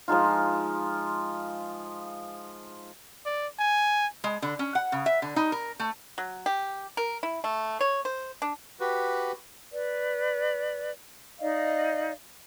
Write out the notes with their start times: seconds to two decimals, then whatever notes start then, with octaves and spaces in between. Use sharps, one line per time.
0.08 F3 G#3 D#4 F4
3.26 D5
3.59 G#5
4.24 G#3
4.42 D3
4.59 C#4
4.75 F#5
4.92 C#3
5.06 E5
5.22 D3
5.36 D#4
5.52 A#4
5.79 A3
6.18 F#3
6.46 G4
6.97 A#4
7.23 E4
7.44 A3
7.81 C#5
8.05 C5
8.42 D4
8.80 F#4 G4 B4
9.72 B4 D5
11.40 D#4 D5 D#5 F5